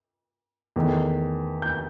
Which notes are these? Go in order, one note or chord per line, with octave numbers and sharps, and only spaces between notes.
E2 D#3 A3
G6